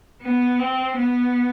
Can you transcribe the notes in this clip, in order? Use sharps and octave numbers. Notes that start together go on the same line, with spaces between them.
B3
C4
B3